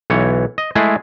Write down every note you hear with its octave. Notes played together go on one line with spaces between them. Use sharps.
B1 E3 C#5
D#5
G#3 A3 E4 G#4